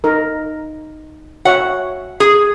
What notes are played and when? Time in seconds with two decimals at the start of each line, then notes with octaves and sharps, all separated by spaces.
0.04 D#4 A#4
1.45 F#4 C#5 E5 F#5
2.20 G#4